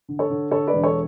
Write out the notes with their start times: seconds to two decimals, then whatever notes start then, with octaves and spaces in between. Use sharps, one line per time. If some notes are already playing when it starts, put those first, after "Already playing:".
0.09 D3
0.19 A4 C#5
0.30 D3
0.51 D3 A4 C#5
0.67 B4 D5
0.73 E1
0.83 A4 C#5